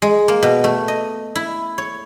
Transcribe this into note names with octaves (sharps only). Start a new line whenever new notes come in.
G#3
A#3
B2
A3
D#5
E4
C#5